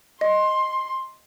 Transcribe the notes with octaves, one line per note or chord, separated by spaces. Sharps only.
D#5 C6